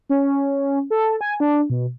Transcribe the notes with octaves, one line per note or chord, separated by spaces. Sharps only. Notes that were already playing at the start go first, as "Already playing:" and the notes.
C#4
A4
G#5
D4
B2